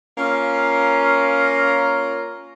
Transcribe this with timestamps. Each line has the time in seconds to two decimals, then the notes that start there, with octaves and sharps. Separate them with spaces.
0.18 A#3 C#4 F4 A#4